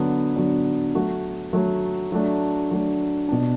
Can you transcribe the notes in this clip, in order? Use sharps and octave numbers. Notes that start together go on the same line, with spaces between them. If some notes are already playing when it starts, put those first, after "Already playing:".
Already playing: D3 F#3 B3 D4
D3 F#3 B3 D4
F#3 A3 F#4
F#3 A3 F#4
F#3 A3 D4
F#3 A3 D4
B2 B3 D4